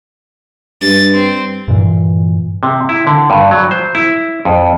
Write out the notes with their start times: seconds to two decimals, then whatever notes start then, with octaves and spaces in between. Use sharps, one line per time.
0.81 G2 A6
1.14 C4
1.68 G2 A#2 E3
2.63 C3
2.89 E4
3.07 D3
3.30 G2
3.51 F#3
3.71 C5
3.95 E4
4.45 F2